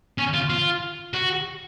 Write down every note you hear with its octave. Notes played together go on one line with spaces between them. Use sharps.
C#4
F4
F4
F#4